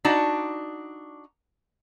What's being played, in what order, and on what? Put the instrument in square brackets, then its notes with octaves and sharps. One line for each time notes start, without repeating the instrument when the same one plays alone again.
[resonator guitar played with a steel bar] D4 D#4 F#4 D5 F#5